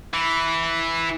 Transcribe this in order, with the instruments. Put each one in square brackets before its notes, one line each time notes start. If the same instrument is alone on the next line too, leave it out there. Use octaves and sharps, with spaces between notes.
[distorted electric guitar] E3